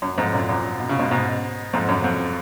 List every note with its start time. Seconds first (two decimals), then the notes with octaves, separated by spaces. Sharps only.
0.02 F#2
0.18 F2 G#2
0.33 F#2 A#2
0.49 F#2 A#2
0.80 B2
0.89 C#3
0.99 G#2 B2
1.11 G#2 B2
1.73 F2 G#2
1.89 F#2
2.04 F2